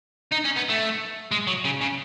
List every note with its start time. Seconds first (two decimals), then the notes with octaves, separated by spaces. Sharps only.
0.32 D#4
0.44 C#4
0.56 B3
0.69 A3
1.32 G#3
1.47 F#3
1.65 C#3
1.81 C#3